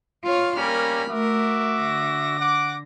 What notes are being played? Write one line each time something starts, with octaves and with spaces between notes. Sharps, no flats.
F4 C#5 F6
G3 A#3 C#4 A#4 B5 F6
A3 F#4 A#4 E5 D6
D3 A#6
F#5 D6